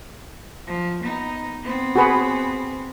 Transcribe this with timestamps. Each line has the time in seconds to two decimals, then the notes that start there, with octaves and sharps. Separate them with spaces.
0.67 F3
1.04 B3 D#4
1.63 B3 C4
1.96 F#4 G#4 B4